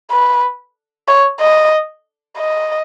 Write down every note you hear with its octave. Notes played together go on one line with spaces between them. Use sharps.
B4
C#5
D#5
D#5